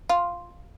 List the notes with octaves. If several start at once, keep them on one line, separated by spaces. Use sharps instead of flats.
F4